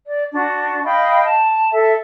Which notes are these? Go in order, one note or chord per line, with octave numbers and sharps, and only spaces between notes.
D5
D4 F#4
D#5 F5 G5 B5
A5
A4 E5